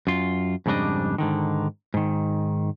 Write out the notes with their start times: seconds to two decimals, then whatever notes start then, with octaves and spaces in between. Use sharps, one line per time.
0.07 F#2 F4
0.66 F2 G#2 C#3 G3 D4 D#5
1.18 G#2 D3 D#3
1.94 G#2 D#3